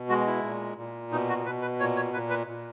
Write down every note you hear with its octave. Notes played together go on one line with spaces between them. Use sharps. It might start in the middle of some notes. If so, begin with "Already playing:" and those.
Already playing: B2
G#3 F#4
E4
A#2
A#2
B2 D#4
F#4
B2 B4
B4
A#2 C#5
C#5
A#2 B4
B4
A#2